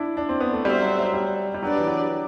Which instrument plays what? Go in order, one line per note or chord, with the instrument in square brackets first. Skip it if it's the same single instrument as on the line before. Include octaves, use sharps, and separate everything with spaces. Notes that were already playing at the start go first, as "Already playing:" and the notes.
Already playing: [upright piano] D4 E4
D4
C4
B3
A3
[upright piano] G3 [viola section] C4 F#4 C5 E5
[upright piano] F#3
F#3
G3
G3
[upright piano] F#3 [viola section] D4 G4 B4 D5
[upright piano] E3
F#3